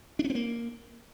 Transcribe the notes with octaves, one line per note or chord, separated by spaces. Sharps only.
D4
C#4
C4
A#3